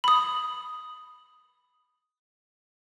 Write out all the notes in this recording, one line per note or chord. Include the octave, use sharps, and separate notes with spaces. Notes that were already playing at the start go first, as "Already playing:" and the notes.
B5 D#6